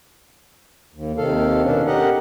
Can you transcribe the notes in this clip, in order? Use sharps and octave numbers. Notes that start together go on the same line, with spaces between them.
D#2
D#2 C3 D#3 A4 F5
B2 C#4 D4
G4 A#4 D#5 F#5